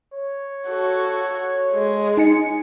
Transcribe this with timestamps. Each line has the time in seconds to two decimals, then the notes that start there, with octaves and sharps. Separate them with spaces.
0.14 C#5
0.69 F#4 A4
1.73 G#3
2.17 D#4 G#5 C#7